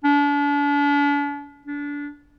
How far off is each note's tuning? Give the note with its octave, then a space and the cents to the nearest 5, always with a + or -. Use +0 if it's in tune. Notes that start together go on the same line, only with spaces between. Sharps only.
D4 -40
D4 -25